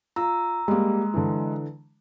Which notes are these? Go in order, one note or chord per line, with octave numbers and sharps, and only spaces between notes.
F4 A#5 E6
G3 G#3 A#3
D3 E3